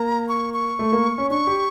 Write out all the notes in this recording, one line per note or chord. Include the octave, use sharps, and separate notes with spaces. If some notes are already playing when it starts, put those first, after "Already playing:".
Already playing: A#3 A#5
C#6
C#6
A3
A#3
C#4
D4 C#6
G4